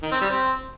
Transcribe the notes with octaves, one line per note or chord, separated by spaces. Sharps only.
D#3
C4
G3
C4